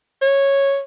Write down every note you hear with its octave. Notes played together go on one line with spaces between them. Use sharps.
C#5